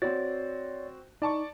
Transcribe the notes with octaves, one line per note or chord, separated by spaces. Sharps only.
C4 F#4 C#5 D5 A6
D#4 D5 A5 C#6